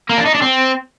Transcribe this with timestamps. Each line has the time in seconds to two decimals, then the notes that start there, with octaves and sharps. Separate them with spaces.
0.09 A#3
0.18 D4
0.25 D#4
0.34 D4
0.42 C4